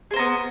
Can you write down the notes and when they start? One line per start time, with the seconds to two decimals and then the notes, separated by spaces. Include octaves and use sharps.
0.11 G#4
0.13 C5
0.16 A#4
0.19 B3